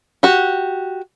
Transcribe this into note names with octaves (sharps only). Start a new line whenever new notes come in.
F#4 G4